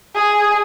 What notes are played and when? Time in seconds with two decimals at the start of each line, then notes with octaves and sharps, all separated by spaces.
0.15 G#4